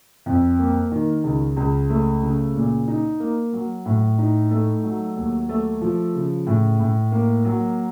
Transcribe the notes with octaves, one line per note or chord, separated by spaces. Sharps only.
F2
A#3
D#3
C#2
C#2
A3
C#3
A#2
D#4
A#3
F#3
A2
D#4
A3
F#3
D#2
A3
F3
C#3
A2
A2
A#3
F#3